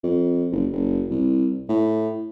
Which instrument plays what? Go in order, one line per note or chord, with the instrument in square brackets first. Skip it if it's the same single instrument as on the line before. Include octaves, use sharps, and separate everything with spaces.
[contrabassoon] F2
F#1
F#1
C2
A2